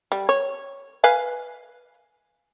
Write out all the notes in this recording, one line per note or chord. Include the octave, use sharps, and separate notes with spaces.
G3
C#5
B4 F5 G#5